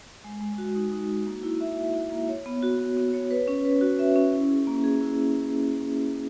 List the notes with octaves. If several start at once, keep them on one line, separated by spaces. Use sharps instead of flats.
G#3
G#3
F#4
D#4
D#4
F#4
A#3
E4
E5
E4
E4
A#3
C#5
B3
F#4
B3
B3
C#5
B4
C#4
B4
F#4
E5
C#4
E4
G#4
A#3
G#4
E4